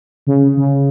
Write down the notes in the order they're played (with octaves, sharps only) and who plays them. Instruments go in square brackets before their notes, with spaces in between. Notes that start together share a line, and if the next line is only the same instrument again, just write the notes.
[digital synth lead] C#3
C#3